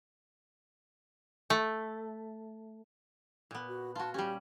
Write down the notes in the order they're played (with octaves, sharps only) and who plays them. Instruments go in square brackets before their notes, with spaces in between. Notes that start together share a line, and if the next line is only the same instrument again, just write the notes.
[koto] A3
A#2 B3
[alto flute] F#4
[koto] F4 F#4 [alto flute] A5
[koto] G3 C#4 [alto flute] G4